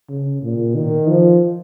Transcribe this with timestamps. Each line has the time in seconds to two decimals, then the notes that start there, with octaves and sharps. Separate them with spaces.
0.09 C#3
0.43 A#2
0.76 D#3
1.09 F3